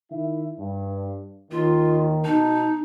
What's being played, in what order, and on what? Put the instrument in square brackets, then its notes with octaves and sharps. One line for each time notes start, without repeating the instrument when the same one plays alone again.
[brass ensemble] D#3 E4 E5
G2
[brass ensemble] D#2 D#3 [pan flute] F4
[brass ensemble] B2 D#5 A5 [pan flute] D#4